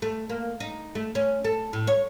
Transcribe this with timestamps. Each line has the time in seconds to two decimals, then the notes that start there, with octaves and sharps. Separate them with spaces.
0.02 A3
0.29 A#3
0.60 D#4
0.95 A3
1.15 C#4
1.44 A4
1.73 A2
1.87 C#5